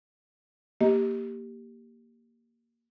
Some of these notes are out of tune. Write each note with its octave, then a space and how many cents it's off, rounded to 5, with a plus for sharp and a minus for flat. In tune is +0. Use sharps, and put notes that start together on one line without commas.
A#3 +0 G4 +0 D#5 +20